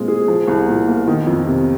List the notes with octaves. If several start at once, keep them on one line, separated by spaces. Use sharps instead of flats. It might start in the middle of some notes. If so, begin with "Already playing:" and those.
Already playing: A#2 G#3 C4
G#4
F3
C2
A#2
A#3
D#3
F2
C3